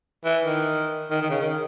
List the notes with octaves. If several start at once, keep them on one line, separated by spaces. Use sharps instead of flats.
E3
D#3
D#3
D#3
C#3
D#3